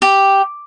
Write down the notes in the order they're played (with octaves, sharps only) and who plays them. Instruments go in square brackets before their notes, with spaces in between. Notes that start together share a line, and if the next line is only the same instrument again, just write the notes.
[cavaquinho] G4